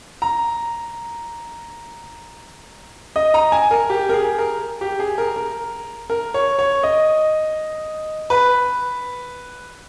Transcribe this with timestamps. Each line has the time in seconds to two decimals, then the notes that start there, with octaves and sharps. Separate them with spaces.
0.22 A#5
3.16 D#5
3.34 A#5
3.52 G#5
3.71 A#4
3.90 G4
4.09 A#4
4.13 G#4
4.38 A#4
4.81 G4
4.99 G#4
5.18 A#4
5.36 A#4
6.10 A#4
6.34 C#5
6.59 C#5
6.83 D#5
8.30 B4